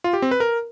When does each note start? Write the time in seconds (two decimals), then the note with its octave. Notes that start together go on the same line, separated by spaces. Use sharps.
0.04 F4
0.13 G4
0.22 C4
0.31 B4
0.40 A#4